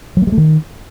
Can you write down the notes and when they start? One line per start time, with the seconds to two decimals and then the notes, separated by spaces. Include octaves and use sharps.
0.17 F#3
0.22 A#3
0.27 G3
0.32 A3
0.37 D#3